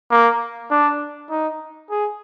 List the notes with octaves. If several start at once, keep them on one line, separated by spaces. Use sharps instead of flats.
A#3
D4
D#4
G#4